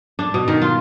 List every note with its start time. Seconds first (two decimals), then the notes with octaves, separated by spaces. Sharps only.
0.19 D4
0.34 B2
0.48 D#3
0.62 F4